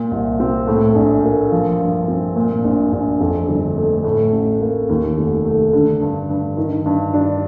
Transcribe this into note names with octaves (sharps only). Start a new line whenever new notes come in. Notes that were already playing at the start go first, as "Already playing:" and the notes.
Already playing: A#2
C2
C4
A2
A#1
A#3
F3
G2
C4
A#2
A#1
A#1
F2
G1
A3
A2
A1
A#3
D#2
F1
A3
D3
G2
G2
D#3
G2
D4